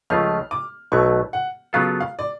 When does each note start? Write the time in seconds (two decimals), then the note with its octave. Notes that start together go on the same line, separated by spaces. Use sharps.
0.10 C#2 C#3 F3 A3 F4 F6
0.51 D6
0.92 B1 B2 F#3 A3 C#6
1.33 F#5
1.73 C#3 F#3 B3 F4 A4 F5
2.00 F5
2.19 D5